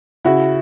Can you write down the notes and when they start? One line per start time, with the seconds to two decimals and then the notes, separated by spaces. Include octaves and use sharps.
0.25 C#3 E4 F#4